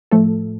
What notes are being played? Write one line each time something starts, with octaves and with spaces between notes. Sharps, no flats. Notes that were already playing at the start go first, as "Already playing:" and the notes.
A2 F3 A3 A4